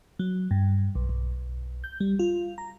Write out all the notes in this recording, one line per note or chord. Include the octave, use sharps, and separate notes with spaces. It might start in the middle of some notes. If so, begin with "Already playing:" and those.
F#3
G2
B1
B1
G6
G3
F4
A#5